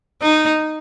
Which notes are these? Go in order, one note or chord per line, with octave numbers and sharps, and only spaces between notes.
D#4